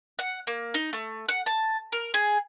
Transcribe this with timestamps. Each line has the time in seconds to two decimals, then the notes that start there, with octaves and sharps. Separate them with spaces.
0.19 F#5
0.47 A#3
0.74 D#4
0.93 A3
1.29 F#5
1.46 A5
1.92 A#4
2.14 G#4